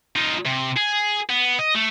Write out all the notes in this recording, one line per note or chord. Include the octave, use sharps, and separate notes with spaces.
D#4 F4
C3
G#4
B3
D#5
A3